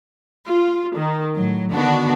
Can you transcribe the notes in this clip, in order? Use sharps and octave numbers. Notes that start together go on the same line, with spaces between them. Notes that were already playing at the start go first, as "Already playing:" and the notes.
F4
D#3
A2 F#3
D3 D#3 B3 D4 F#4